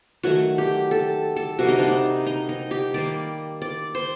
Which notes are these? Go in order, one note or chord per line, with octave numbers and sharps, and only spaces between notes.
D#3 F#3 A3 F#4
G4
A4
A4
C3 G3 A#3 F#4
D#4
D4
D#4
D#4
D#4
G4
D#3 G3 A#3 D5
D5
C5